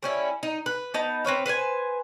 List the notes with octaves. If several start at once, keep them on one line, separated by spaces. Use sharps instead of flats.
G3 C#4 E4
D#4
B4
B3 D#4 A5
C4 B4 C#5 F5
B4 C5 F#5 G#5